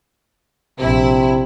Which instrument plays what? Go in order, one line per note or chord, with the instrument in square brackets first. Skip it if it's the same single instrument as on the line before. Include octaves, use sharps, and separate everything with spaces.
[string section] A#1 E4 [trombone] C3